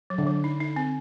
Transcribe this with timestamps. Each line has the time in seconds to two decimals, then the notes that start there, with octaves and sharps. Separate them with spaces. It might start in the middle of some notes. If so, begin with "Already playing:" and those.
0.10 F#3
0.18 D3
0.27 F#3
0.44 D#4
0.61 D#4
0.76 C4